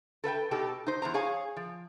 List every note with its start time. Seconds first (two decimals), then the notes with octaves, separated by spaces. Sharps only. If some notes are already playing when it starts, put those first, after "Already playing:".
0.24 A4 B4 F#5 G5
0.51 B2 D#4 G4 A4
0.86 D#4 C5
1.02 E2 D#3 C5 A#5
1.14 G#4 C#5 F5 G#5
1.56 F3